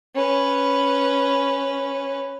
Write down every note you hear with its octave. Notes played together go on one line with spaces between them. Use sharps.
C#4 B4